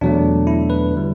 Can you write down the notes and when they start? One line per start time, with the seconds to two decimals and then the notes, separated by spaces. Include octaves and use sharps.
0.01 E2 B2 F#3 A3 D4
0.47 E4
0.70 B4
0.95 D3 G3